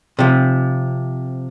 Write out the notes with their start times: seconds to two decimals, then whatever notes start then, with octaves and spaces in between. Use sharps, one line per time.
0.19 C3 F3